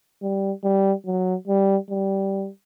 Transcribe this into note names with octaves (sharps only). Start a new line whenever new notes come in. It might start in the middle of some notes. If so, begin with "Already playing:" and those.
G3
G3
F#3
G3
G3